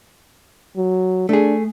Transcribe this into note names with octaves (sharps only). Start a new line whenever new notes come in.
F#3
A3 D4 G#4